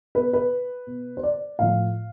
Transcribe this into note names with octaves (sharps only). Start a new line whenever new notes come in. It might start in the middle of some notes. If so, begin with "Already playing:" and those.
B2 B4
B4
B2
C5
D5
A2 F3 F5